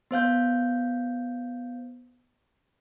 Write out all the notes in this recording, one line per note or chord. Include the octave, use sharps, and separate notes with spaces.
B3 C5 F5 G6